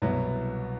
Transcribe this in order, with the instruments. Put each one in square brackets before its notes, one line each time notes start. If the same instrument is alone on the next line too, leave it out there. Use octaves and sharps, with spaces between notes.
[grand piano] C2 B2 F#3 B3 E4